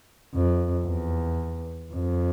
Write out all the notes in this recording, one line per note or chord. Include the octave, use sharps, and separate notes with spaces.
F2
E2
F2